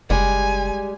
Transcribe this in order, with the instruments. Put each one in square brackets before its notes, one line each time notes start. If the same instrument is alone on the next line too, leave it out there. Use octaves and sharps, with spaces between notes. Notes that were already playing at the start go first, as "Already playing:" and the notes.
[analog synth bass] F#1 [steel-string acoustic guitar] G3 G#3 [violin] G#5